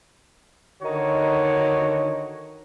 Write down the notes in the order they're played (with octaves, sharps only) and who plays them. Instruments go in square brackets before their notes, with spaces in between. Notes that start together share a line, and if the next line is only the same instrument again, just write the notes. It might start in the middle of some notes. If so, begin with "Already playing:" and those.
[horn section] D3 D#3 D#4 F#4 C#5